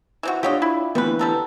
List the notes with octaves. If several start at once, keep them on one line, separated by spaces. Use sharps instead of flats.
E3 C4 F#4
D4 F4 G4 C#5 D#5 G5
E4
D2 E3 G3 B3 B4
G3 A4 A#4